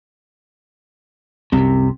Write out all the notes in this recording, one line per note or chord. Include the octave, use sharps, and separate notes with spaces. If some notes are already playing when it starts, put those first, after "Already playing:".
C2 F#2 C3